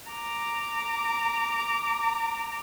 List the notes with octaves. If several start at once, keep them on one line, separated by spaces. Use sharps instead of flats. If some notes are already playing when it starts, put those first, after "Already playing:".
A#5 D6